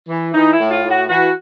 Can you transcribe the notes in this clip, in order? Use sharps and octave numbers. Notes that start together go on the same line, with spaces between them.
E3
E3 D#4
E4
A2
F4
A2
F#4
E3 F#4